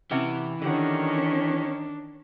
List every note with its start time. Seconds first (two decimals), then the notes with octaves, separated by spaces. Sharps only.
0.11 C3 E3 C#4 F#5
0.62 D3 D#3 C#4 D4 G4 F#5